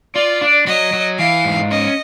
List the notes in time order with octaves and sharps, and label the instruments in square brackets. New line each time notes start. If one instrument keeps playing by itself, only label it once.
[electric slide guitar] F4 [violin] D5
[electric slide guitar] D4
[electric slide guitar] F#3 [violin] D#5
[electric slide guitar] F#3
[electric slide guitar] E3 [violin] F5
[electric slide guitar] G#2
[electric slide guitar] C#4 [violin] D#5